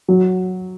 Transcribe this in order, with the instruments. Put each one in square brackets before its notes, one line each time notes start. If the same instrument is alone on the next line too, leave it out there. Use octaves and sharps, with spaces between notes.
[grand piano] F#3